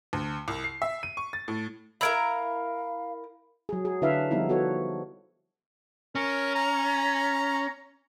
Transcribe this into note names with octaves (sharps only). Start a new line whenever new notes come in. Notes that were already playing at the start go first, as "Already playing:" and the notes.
D2
C2
C7
E5
D#7
C#6
A6
A2
E4 A#4 F5 A#5 B5 E6 G#6
F#3 G#4
G#4
D3 D4 E4 B4 E5 F5
F3 G3 B3 D#4 E4
B3 F#4 A4 C#5
C#4 A#4
A#5